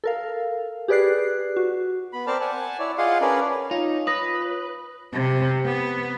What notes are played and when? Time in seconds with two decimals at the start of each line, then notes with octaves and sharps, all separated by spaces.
0.04 A4 A#4 F5
0.88 G4 G#4 B4 D5 F#6 C7
1.56 F#4
2.13 B3 B5
2.27 C4 A#4 C5 D5 A5 F6
2.41 F#5 G#5 A5
2.79 E4 C#5 D5
2.98 F4 G#4 D#5 F5 F#5 C6
3.21 C#4 D4 G#4 A#4 B4 D5
3.71 D#4 F4 C#5
4.07 B4 D#6 A#6
5.13 C3
5.66 B3